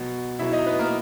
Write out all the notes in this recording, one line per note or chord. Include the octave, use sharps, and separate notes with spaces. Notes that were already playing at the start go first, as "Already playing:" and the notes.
Already playing: B2 F#3
B2 F#3 E4 E5
D#4 D#5
B3 B4
A#3 A#4